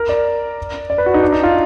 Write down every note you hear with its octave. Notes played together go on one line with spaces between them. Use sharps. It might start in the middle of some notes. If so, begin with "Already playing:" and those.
Already playing: A#4
D5
D5
B4
F#4
D#4
D4
D#4
F4